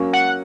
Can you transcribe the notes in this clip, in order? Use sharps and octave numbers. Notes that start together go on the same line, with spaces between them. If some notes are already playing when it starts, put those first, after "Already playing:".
Already playing: F#3 A#3 C#4
F#5